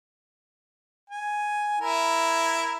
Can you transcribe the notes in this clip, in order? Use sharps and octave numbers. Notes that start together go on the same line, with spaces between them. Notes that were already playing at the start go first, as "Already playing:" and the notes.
G#5
E4 A#4